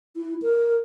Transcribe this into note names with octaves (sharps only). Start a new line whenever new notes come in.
E4
A#4